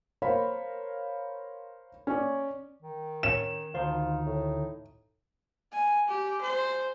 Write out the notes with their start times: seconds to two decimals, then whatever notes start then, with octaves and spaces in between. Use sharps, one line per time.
0.22 A#4 C5 C#5 F5 B5
2.07 C#4 C#5 D5
2.82 D#3
3.23 C#4 C#5 E7
3.74 D2 D#3 D#4 F4 C5
4.26 A2
5.72 G#5
6.08 G4
6.42 C5